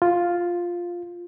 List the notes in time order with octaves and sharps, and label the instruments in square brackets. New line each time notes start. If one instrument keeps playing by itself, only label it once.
[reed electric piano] F4